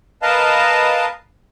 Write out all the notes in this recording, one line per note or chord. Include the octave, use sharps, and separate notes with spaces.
A#4 B4 D#5 F5 A5